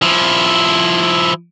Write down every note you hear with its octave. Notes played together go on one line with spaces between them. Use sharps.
F3 E4